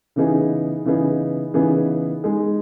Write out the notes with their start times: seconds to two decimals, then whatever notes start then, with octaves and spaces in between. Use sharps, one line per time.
0.16 C#3 E3 B3 D#4 G#4
0.85 C#3 E3 B3 D#4 G#4
1.54 C#3 E3 B3 D#4 G#4
2.24 G#3 D#4 G#4